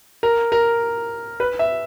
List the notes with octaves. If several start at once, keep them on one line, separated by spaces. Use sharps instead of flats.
A#4
A#4
B4
E5